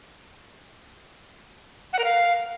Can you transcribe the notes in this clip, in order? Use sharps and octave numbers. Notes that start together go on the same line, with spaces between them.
F#5
A#4
F5